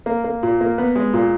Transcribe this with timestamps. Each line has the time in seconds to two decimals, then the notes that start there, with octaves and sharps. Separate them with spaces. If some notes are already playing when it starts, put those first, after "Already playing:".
0.06 A#3
0.24 A#3
0.43 A#2
0.61 A#3
0.78 B3
0.95 G#3
1.13 A#2